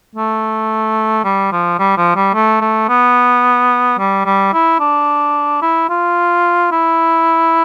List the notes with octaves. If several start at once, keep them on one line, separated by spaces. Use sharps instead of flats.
A3
G3
F3
G3
F3
G3
A3
A3
B3
G3
G3
E4
D4
E4
F4
E4